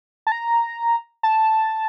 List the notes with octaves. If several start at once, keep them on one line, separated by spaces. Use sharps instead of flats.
A5
A#5
A5